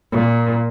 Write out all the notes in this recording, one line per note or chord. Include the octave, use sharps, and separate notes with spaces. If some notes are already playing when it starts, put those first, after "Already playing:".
A#2